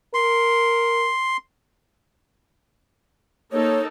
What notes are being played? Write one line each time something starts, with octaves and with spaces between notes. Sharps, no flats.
A#4 C6
A#3 D#4 A4 C#5